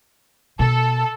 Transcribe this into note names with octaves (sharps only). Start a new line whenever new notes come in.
B2 A4